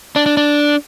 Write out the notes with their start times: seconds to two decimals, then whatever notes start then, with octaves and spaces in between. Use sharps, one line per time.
0.16 D4
0.26 D4
0.37 D4